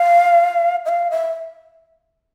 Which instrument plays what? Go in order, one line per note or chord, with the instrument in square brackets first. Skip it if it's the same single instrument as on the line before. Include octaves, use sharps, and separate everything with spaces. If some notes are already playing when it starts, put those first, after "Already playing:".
Already playing: [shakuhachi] F5
E5
F5
E5